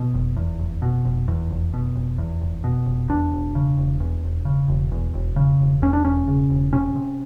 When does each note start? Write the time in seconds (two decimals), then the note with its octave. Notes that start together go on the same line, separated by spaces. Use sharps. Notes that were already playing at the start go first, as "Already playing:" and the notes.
Already playing: B2
0.14 F1
0.36 E2
0.60 F1
0.82 B2
1.05 F1
1.28 E2
1.50 F1
1.74 B2
1.95 F1
2.18 E2
2.42 F1
2.64 B2
2.86 F1
3.10 E2 D4
3.32 E1
3.55 C#3
3.77 E1
4.00 E2
4.23 E1
4.45 C#3
4.68 E1
4.91 E2
5.14 E1
5.36 C#3
5.59 E1
5.82 E2 C#4
5.93 D4
6.05 E1 C#4
6.27 C#3
6.50 E1
6.73 C3 C#4
6.96 C3